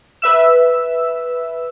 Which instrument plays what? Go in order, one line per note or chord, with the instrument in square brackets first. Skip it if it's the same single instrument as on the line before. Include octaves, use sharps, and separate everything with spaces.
[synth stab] B4 E5 E6